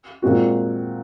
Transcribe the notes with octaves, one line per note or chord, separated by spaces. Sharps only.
A#2 G#3 C4 F#4